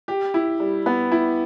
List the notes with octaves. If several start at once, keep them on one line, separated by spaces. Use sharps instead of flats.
G4
E4
G3
B3
E4